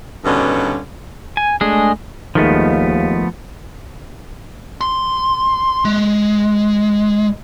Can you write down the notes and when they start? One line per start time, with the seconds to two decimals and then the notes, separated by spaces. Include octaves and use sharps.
0.25 G2 B2 D3 D#3 C#4
1.37 G#5
1.61 G#3 A3 D4 G#4
2.35 D#2 D#3 F3 G#3 A3 B3
4.81 C6
5.85 G#3